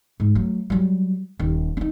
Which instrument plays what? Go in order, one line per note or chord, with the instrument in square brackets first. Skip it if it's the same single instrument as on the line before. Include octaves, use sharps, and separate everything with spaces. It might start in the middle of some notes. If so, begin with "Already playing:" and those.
[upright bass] G#2
F#3 A3
F#3 G3
D#1 D#3
C#4 D#4